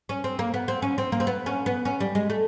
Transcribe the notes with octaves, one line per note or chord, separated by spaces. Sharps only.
C#4
C4
A#3
B3
C4
C#4
C4
A#3
C4
B3
C#4
B3
C#4
G3
G#3
A3